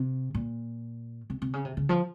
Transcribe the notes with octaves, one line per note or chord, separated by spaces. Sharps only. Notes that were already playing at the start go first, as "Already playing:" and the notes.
Already playing: C3
A#2
C3
C3
C#3
C3
C#3
F3